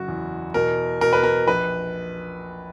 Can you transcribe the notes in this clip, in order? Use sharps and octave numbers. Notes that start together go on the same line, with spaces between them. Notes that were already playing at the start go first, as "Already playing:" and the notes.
Already playing: F#1 F#4
E2
B2 A#4
B2 A#4
B4
A#4
A#1 B4